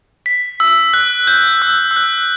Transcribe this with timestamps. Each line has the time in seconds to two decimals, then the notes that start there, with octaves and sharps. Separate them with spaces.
0.26 B6
0.60 E6
0.94 F#6
1.27 G6
1.62 E6
1.91 E6
1.96 F#6